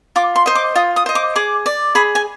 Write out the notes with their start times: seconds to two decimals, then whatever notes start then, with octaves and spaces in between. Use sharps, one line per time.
0.16 F4 D6
0.36 C6
0.46 C5 D#5
0.55 D6
0.75 F4 D#6
0.96 D#6
1.06 C5 D#5
1.15 D6
1.36 G#4 D6
1.66 D5
1.95 G#4 B5
2.15 G#5